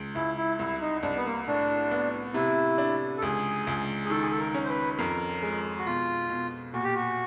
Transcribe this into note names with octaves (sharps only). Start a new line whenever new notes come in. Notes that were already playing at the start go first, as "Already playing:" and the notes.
Already playing: C#2
C#2 E4
E4
C2 E4
D#4
C2 D4
B3
A#3
A2 D4
B3
C3 E4
D4
A4
C#2 G#4
C#2
G#4
D#3 A4
G#4
A4
A#4
C#4
C5
B4
F2 A#4
G#3
F#4
B2 F4
B2
A#2 F#4
G4
F#4